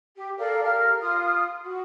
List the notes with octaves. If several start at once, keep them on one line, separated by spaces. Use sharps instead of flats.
G4
A4 A#4 D5 F5
G4 A#4 F5 F6
F4 D#6 F6
F#4